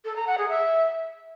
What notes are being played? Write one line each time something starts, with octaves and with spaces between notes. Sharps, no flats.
A4
A#5
F#5
G#4
E5